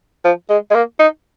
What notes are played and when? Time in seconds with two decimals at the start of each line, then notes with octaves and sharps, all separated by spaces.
0.24 F3
0.50 G#3
0.71 G#3
0.74 A#3
0.99 D#4